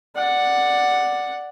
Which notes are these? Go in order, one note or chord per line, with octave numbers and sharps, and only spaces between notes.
D5 F#5